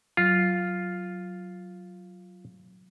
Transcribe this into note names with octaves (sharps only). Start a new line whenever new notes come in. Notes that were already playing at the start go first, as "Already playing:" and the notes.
F#3 F4